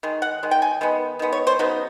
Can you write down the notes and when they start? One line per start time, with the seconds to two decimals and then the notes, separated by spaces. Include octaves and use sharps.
0.03 D#3 G#3
0.22 F#5
0.43 D#3 G#3
0.51 G5
0.62 G#5
0.81 D#3 G#3 B3
1.19 D#3 G#3 B3
1.32 C#5
1.47 C5
1.59 C#3 F#3 B3 D#4